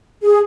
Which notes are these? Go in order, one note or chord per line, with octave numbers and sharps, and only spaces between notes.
G#4